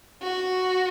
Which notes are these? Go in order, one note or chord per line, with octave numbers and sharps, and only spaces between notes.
F#4